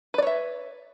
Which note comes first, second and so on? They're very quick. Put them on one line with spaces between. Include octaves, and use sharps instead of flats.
B4 D5 C#5 E5